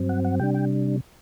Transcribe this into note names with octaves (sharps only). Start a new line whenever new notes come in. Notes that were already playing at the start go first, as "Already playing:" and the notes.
Already playing: G2 F#3 C4
F#5
F#5
C3 G3 D4 G5
G5